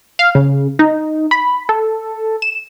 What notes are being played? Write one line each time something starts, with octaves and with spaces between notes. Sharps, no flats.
F5
C#3
D#4
B5
A4
E7